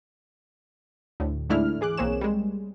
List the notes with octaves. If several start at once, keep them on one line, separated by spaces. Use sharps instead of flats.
D2 A2
D2 G#2 A3 D4 E4 F6
E3 G#4 D6 F#6
B1 A#3 C4 G#4 C#5 E7
G3 G#3